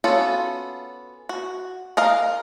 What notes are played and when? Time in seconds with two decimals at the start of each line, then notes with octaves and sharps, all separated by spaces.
0.04 B3 C#4 F4 F#4 A4
1.29 F#4
1.97 A#4 D#5 F5